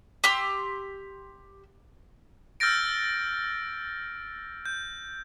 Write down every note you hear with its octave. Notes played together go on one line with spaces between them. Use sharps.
G4 C6 E6
E6 F6 G6 A6 A#6 D7
G6